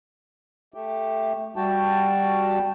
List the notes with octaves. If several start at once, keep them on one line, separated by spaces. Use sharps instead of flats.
A3 G4
G3 F#4 G5 A5